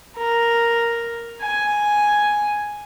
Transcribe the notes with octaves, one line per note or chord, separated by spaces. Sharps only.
A#4
G#5